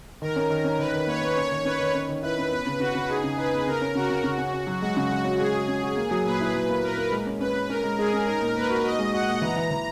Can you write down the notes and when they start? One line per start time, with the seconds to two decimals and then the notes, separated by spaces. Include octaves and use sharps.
0.22 D#3 A#4
0.36 C#4
0.50 D#3
0.64 C#4
0.79 D#3 B4
0.93 D#3
1.07 A#3 C#5
1.22 A#3
1.37 C#4 C#5
1.52 D#3
1.65 C#4 B4
1.80 D#3
1.94 C#4
2.09 D#3
2.23 E4 B4
2.38 C#4
2.51 B3 B4
2.66 C#3
2.80 C#3 F#4
2.95 C#3
3.09 D#4 G#4
3.24 C#3
3.37 D#4 B4
3.52 B3
3.67 C#3 A#4
3.81 C#4
3.95 C#3 F#4
4.10 C#3
4.24 C#3
4.38 C#4
4.54 C#4
4.67 F#3
4.82 G#3 F#4
4.97 C#3
5.11 G#3 F#4
5.24 C#4
5.39 G#3 G#4
5.54 F#4
5.68 C#4
5.83 F#4
5.97 A#3
6.11 F#3
6.26 A#2 B4
6.41 E4
6.55 F#3
6.69 A#3
6.83 A#2 A#4
6.97 A#3
7.12 G#3
7.27 C#4
7.40 C#4 B4
7.55 C#4
7.69 C#4 A#4
7.84 G#3
7.98 G#3 G#4
8.13 C#4
8.27 D#4 A#4
8.41 A#2
8.55 A#2 B4
8.70 F#4
8.84 F#4 D#5
8.99 G#3
9.13 F#4 F#5
9.28 A#2
9.42 E3 A#5
9.56 E3
9.71 E3